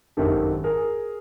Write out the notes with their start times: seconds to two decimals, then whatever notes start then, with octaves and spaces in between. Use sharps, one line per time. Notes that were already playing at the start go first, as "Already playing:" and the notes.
0.17 G#1 F#2 D#3 G4 A4
0.64 G#4 A#4